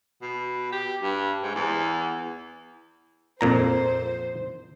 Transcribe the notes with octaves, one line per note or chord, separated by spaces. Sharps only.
B2
G4
G2
G#2
E2
F2 A#2 C5 A#5